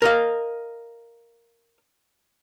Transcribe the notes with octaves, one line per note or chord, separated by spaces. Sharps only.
A#4 D#5 F5